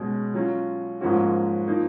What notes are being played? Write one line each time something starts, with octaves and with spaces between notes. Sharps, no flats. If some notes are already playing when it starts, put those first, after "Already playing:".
Already playing: B2 G#3 C#4
F#3 C#4 F4
G#2 F3 A#3 C#4 F#4
F3 A#3 D#4